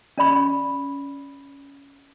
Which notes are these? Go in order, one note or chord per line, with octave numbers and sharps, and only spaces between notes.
C#4 D5 B5 C#6